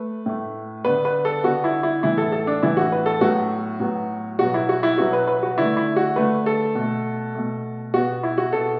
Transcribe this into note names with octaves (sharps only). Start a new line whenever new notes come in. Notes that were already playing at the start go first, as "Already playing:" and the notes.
Already playing: A3 B4
A2 A3
D3 B3 B4
B4
A4
D3 B3 F#4
E4
E4
A2 E3 B3 E4
A4
A4
D4
A2 E3 B3 E4
F#4
B4
A4
A2 F#3 B3 F#4
A2 F#3 B3
B2 F#3 B3 F#4
E4
F#4
E4
B2 F#3 B3 F#4
B4
B4
F#4
D3 A3 E4
E4
F#4
D3 A3 B4
A4
B2 A3
B2 A3
B2 B3 F#4
E4
F#4
B2 B3 A4